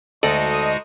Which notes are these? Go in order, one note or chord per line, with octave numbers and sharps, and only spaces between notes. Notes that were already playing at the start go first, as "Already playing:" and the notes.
D2 G#3 D#4 F#4 A4 D5 D#5